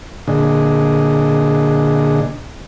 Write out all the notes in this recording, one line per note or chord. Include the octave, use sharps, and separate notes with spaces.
A#2 D3 D4 G#4 D#5